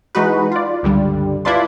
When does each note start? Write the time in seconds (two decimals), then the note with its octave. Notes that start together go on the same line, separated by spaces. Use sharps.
0.15 E3 G#3 D#4 F#4 B4
0.52 F4 D5
0.83 C#2 G2 D3 G3
1.45 E4 F4 B4 D5 A5 C6